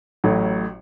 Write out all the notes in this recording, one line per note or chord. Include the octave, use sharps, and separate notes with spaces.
A1 A2 F#3